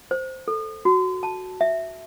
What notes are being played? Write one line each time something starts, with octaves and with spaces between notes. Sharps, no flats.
C5
A4
F#4
A5
E5